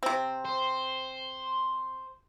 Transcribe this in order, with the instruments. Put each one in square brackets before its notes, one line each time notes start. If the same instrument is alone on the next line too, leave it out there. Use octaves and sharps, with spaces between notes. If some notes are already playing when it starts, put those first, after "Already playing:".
[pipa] C3 C4
[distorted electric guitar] C5